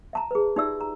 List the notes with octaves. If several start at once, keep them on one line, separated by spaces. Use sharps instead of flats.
E5 A5 A#5
G#4 B4
D#4 F4 G4 D5 E5 E6
A#5